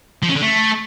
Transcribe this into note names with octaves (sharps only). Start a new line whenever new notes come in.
F3
C#4
D3
A3